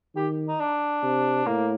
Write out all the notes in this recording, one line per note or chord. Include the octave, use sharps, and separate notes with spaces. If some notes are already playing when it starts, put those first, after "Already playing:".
D#3 G4
D#4
D4
C3
A2 A#3